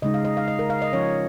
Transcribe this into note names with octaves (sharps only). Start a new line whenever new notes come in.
C#3 G#3 D#4 D#5
F5
D#5
F5
D#5
A#4
F5
D#5
F3 C#4 C#5